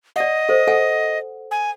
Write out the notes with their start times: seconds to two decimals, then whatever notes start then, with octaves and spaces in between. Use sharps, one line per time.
0.16 D5 D#5 F#5
0.49 A4 C5
0.67 A4 F#5 G#5
1.51 G#5